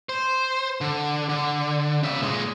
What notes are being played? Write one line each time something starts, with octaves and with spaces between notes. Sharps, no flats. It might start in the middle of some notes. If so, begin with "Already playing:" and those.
C5
D3
D3
C#3 E5
A#2 G#3